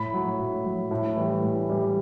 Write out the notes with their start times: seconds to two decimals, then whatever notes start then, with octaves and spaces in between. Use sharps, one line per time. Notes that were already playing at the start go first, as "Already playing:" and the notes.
Already playing: A2 B5
0.14 F#3
0.39 A2
0.65 F#3
0.91 A2
1.16 E3 G3
1.43 A2
1.69 E3 G3